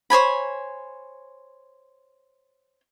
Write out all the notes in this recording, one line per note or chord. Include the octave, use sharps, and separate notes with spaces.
C5 C#5 G#5 B5